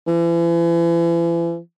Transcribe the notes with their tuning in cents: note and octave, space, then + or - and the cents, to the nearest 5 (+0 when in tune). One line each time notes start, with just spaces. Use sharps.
E3 +40